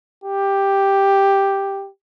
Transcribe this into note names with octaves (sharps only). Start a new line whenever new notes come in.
G4